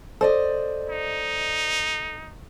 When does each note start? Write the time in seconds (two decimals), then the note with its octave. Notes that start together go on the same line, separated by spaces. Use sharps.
0.21 A4 C5 D5 D#5
0.89 D#4